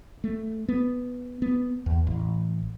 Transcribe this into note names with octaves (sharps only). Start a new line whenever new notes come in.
A3
B3
B3
E2
A1